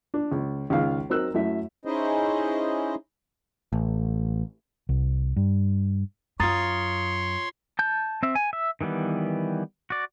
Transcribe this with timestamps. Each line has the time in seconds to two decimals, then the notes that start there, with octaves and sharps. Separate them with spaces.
0.14 D4
0.32 C#2
0.70 C#2 D#3 G#4 F5 F6
1.10 F#3 C4 D#4 A#4 E6 F#6
1.34 F#2 A3 E4 E5
1.85 C#4 D#4 E4 G#4 C5 D#5
3.73 A1
4.89 C2
5.37 G2
6.40 F#2 F4 C#5 A#5 C6 D#6 A6
7.79 A5 G6
8.23 C4 E5
8.35 G#5
8.53 E5
8.81 D#3 E3 G3 B3
9.90 F#4 D5